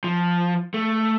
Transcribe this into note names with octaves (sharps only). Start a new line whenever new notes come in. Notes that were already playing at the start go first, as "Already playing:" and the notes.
F3
A3